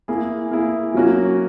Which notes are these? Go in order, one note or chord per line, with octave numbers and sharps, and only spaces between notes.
A#3 E4 G#4
A#3 E4 G#4
F#3 A#3 C#4 F#4